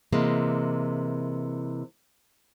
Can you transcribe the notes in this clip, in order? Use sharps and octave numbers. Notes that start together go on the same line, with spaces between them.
C3 E3 G#3 A#3